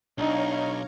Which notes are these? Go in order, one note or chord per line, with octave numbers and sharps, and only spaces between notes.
B1 D4 D#4 C#5 F5 A#5